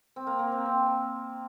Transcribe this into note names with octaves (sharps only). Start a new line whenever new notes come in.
C4
A#3
A#3
C4
C4